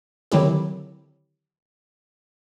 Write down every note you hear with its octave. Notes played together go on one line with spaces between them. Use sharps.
D3 D#3 F#3 C4 E4 G4